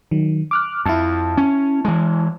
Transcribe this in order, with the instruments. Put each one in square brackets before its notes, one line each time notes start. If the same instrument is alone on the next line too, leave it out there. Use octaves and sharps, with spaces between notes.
[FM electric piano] D#3 F#3
D6 F6 F#6
[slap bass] F2 [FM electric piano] E4 A5
[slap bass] C#4
E3 G#3